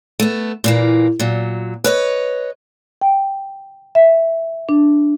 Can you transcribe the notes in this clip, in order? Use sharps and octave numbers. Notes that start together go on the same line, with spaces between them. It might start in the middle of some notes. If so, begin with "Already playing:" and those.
A3 B3
A#2 E3 A#3
A#2 F#3
B4 C#5 D#5
G5
E5
D4